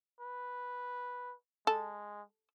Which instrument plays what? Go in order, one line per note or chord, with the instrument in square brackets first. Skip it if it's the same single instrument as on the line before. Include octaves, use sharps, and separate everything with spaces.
[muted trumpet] B4
[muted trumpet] G#3 [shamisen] A4